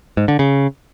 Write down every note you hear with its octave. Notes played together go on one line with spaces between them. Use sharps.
G#2
D3
C#3